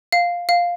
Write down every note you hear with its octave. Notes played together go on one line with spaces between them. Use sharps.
F5
F5